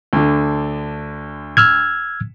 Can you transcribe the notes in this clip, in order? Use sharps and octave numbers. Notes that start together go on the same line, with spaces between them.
D2 D3
E6 F6 G#6